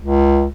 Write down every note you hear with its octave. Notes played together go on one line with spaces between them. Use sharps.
C#2